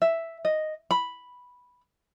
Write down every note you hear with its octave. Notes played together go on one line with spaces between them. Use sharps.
E5
D#5
B5